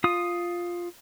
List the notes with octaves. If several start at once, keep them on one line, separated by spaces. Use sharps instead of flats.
F4 D#6